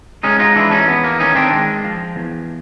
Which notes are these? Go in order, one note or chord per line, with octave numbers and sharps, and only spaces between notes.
G#3 C#4 D#4
D#4 F4
E3 D4 E4
C#4 D#4
E2 B3
A#3
D#3 C#4 D#4
C4 D4
G#3
F3
E2